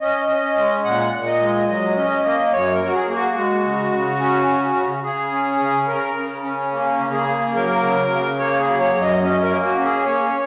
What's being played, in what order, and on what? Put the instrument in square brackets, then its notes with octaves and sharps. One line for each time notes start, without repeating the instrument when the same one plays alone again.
[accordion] C#4 D#5
C#4
G#3
A#2 F#5
A#2
D#5
G#3
F#3 D#5
C#4 D#5
A#3 D#5
F#2 C#5
A#4
F#3 F#4
G#4
A#3 G#4
F#4
G#3
C#3
C#3
C#4
C#3
C#3
C#3 G#4
C#4
C#3
C#3 A#4
C#3
C#4
A#3
C#3
G#4
A#3
F#3 A#4
C#3
C#3
A#3 C#5
G#4
F#3
C#5
F#2
D#5
C#4 D#5
A#4
A#3
F#4
C#4
G#4
A#3 C#5